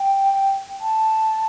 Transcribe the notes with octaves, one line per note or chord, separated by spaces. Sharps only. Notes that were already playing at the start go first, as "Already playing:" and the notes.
Already playing: G5
A5